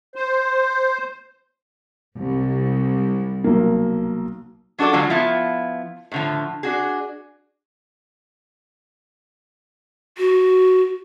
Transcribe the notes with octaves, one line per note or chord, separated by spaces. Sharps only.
C5
C2
B1 A#3
F#3 D4 F#4 A4 D5
D3 F3 F#3 G#3 F4
F3 B3 E4 F4
A2 D3 F3
D4 F#4 G#4
F#4